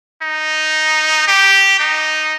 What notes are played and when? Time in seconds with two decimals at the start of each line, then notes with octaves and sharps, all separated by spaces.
0.23 D#4
1.28 G4
1.80 D#4